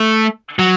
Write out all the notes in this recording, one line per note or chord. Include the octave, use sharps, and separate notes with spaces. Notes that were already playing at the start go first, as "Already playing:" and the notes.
Already playing: A3
F#3